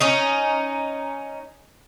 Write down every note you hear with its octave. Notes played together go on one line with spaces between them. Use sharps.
C#4 D#4